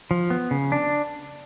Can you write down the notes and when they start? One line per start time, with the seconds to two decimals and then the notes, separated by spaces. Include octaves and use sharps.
0.11 F3
0.30 B3
0.51 C#3
0.72 D4